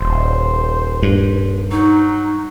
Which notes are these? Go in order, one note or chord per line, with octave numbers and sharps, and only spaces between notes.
D#1 C5
G2
F#3 D#4